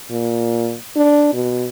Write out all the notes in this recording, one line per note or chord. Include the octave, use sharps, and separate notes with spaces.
A#2
D4
B2